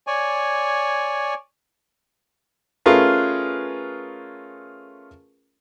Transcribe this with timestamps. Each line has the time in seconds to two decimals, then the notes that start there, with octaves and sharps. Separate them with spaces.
0.07 C#5 D5 G#5
2.86 A3 C#4 F4 G#4 A#4 B4